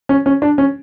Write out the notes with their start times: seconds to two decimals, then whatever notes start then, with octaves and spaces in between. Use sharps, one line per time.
0.09 C#4
0.26 C#4
0.42 D4
0.58 C#4